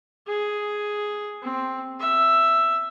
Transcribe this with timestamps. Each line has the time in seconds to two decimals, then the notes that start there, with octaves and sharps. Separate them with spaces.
0.27 G#4
1.43 C4
2.00 E5